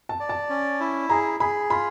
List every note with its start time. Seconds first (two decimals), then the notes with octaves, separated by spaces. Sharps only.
0.09 A5
0.20 D5
0.29 A5
0.50 C#4
0.80 E4
1.10 G#4 A#5
1.40 G#4 B5
1.70 F4 B5